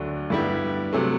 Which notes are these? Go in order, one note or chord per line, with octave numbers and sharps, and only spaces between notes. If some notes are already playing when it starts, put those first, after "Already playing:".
Already playing: D2 D3 F#3
G2 D3 G3 B3 E4
C3 F#3 A3